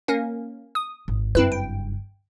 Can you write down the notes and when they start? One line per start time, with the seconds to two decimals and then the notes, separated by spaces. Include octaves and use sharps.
0.08 A#3 C#4 A#4
0.75 D#6
1.08 G#1
1.35 F#1 G2 C4 E4 B4
1.52 G5